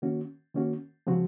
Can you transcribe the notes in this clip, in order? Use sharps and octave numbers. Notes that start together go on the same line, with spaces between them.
D#3 A#3 C#4 F#4
D#3 A#3 C#4 F#4
C#3 F3 G#3 C4 F#4